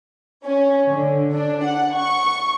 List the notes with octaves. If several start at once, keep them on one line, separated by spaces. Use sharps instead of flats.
C#4
D3
D4
F#5
C#6